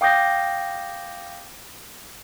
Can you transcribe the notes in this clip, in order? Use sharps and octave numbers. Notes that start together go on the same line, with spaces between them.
F5 G5 D6 D#6 G6 A#6